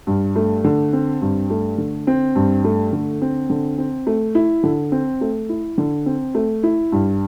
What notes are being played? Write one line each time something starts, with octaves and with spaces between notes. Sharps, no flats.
G2
A3
D3
C4
G2
A3
D3
C4
G2
A3
D3
C4
D3
C4
A3
E4
D3
C4
A3
E4
D3
C4
A3
E4
G2